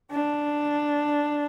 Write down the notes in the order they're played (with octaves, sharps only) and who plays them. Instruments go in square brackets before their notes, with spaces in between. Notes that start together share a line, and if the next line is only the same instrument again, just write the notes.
[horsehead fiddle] D4